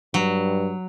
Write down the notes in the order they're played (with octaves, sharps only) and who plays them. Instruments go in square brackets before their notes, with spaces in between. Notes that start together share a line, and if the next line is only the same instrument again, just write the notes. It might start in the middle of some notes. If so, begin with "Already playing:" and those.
[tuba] G2 [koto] F#3